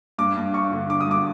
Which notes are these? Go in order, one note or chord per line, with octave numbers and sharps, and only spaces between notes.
G2 D6
G2
G2 C#6
D3
D3 D6
D#6
G2 D6